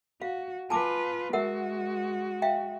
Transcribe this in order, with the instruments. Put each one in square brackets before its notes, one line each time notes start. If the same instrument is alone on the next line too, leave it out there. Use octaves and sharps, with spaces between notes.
[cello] F#4 [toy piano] F5
[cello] F4 B4 [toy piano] G#5 A5 D6
[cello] G#3 F#4 [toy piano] A#4 E5 F#5
[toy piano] E5 F5 G5